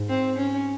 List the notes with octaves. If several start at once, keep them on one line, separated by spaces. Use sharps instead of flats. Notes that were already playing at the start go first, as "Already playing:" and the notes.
Already playing: G#2
C4
C#4